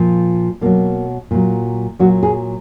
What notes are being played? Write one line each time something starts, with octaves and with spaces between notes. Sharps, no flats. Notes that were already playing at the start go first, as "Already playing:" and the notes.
Already playing: A#2 F3
B2 F#3 A#3
A#2 F#3
A#2 F#3 F#4
G#4